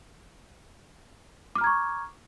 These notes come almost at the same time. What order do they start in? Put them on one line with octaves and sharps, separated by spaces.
D6 F6 A#5 G#6 C#6